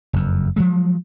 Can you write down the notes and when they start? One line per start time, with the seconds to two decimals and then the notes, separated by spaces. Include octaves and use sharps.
0.13 F#1 F2
0.56 F3 F#3 G#3